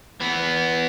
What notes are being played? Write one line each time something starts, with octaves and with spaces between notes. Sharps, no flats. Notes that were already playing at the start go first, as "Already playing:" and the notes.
E3 B3